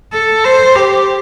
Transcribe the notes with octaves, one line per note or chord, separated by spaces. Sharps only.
A4
C5
G4